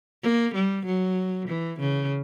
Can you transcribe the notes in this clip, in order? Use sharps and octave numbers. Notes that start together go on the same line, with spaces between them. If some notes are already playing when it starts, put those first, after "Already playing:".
A#3
G3
F#3
E3
C#3